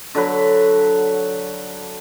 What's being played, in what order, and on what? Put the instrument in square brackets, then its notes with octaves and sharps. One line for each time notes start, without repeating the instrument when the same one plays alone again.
[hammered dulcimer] D3 F#3 B4